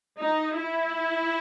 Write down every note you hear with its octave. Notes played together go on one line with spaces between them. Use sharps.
D#4
E4